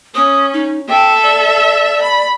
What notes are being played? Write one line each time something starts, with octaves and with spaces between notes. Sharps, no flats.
C#4 D#6
D#4
A4 E5 G5
D5
B5